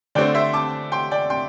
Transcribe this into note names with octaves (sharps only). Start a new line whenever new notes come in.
D3 A3 C4 D5 G5
C5 E5
A5 D6
G5 C6
D5 G5
G5 C6